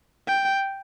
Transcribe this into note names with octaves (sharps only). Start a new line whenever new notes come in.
G5